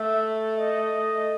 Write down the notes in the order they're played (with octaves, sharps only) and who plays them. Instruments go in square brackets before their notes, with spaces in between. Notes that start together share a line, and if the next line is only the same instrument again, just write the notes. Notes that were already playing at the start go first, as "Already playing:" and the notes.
Already playing: [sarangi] A3 [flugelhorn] E5
[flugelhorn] D#5